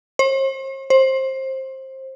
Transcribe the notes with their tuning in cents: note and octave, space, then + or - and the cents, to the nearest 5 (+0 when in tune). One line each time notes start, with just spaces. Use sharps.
C5 +45
C5 +20